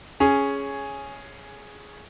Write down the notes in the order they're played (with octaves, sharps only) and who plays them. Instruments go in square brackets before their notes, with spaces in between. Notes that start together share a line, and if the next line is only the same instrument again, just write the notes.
[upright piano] C#4 G#4